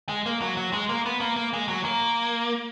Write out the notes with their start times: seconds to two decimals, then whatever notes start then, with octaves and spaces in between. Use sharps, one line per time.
0.09 G#3
0.26 A#3
0.42 F#3
0.57 F#3
0.73 G#3
0.89 A#3
1.06 B3
1.21 A#3
1.36 A#3
1.53 G#3
1.69 F#3
1.85 A#3